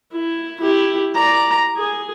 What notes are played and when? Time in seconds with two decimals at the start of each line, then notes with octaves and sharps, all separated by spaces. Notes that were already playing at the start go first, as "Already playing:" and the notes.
0.12 E4
0.60 E4 G4
1.14 D5 A#5
1.77 G#4